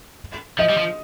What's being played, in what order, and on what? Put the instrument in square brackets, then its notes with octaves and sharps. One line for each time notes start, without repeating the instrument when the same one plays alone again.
[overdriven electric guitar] F3 [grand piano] D#5
[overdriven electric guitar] G3
F3